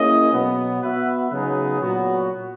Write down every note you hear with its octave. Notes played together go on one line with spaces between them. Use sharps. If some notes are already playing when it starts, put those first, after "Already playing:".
Already playing: A#3 C#4 E4 G#4 D#5
B2 F#3 B3
B3 F#4 B4 E5
C#3 F#3 B3 D#4 G#4
A#2 F#3 B3 F#4